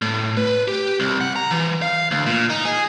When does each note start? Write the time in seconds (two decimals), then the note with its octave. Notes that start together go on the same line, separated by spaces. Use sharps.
0.02 A2
0.37 B4
0.68 G4
1.00 C2
1.21 F#5
1.36 A#5
1.51 E3
1.82 F5
2.11 D2
2.27 A#2
2.50 D#4
2.65 G#4